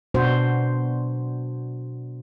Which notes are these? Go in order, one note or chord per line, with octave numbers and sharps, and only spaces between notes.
B2 D4 F#4 C5